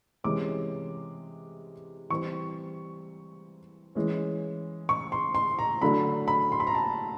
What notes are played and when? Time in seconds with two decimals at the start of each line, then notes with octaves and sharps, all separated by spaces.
0.24 C3 E3 G#3 C#4 D6
2.10 E3 G3 C4 C#6
3.95 E3 G#3 C#4
4.89 C#6
5.12 C6
5.35 C6
5.59 A#5
5.82 D3 F#3 A3 D4 B5
6.28 B5
6.52 C6
6.60 B5
6.67 A#5
6.75 A5